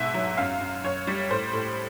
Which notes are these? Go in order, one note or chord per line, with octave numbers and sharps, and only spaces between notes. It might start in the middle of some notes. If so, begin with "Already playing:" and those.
Already playing: G#2 B2 E5
F#3
F#2 F5
F#2
F#2 C#5
G3
A2 C5
A2